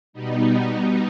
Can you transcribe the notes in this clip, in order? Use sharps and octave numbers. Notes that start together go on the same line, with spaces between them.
B2 G3 B3 D#4